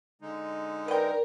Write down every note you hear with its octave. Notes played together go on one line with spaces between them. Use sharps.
D3 G#3 D#4
A#4 B4 D5 G5